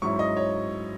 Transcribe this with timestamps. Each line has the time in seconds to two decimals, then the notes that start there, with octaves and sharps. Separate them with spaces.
0.02 G#2 F#3 C#4 E4 C#6
0.19 D#5
0.36 C#5